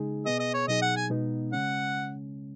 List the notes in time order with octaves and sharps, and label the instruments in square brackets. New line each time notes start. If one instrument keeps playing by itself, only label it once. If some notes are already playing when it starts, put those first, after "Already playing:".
Already playing: [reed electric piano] C#3 G#3 D#4 G#4
[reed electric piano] B2 B3 G#4 [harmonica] D#5
[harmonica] D#5
C#5
[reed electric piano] B2 F#3 D#4 G#4 [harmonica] D#5
[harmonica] F#5
G#5
[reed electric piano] B2 G#3 B3 D#4
[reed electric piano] C#3 G#3 C#4 [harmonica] F#5